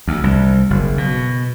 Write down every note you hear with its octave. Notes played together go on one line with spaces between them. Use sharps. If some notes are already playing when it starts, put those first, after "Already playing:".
D2
C2
F#1
B2